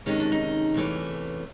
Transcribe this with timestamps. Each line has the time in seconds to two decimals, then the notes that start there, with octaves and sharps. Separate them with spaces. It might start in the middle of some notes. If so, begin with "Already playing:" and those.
0.06 D2 C3 D#3 G#3 C#4 D#4
0.20 D4
0.32 D#4
0.74 E2 C3 E3 A3 C#4